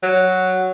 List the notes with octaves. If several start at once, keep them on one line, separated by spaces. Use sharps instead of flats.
F#3